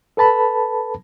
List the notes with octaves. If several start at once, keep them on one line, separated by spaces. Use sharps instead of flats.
A4 B4 A5 B5